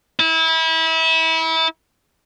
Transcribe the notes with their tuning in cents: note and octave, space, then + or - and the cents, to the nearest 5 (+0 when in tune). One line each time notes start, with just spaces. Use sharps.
E4 -30